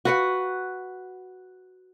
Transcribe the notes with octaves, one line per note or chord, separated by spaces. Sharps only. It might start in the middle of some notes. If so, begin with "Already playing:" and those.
F#4 B4 F#5